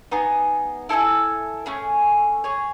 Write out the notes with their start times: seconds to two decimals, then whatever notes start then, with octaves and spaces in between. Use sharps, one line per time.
0.11 B3 D#4 G#4
0.89 E4 A4 E5 G#5
1.66 A3 C#4 G#4
2.44 G#4 C#5 G#5